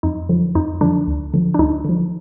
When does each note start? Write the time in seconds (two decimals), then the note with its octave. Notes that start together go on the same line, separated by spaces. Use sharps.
0.03 F2 D#4
0.29 D3 F3
0.55 F2 D#4
0.81 D3 F3 D4
1.07 D2
1.34 D3 F3
1.54 D4
1.59 D2 D#4
1.85 D3 F3